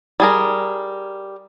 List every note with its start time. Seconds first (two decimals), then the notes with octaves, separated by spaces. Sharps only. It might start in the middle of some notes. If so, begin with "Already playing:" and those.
0.20 G3 G#4 A#4